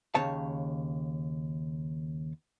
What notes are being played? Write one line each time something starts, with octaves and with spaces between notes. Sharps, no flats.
D#2 C#3 C#5 A5